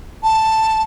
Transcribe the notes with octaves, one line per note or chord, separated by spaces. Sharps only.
A5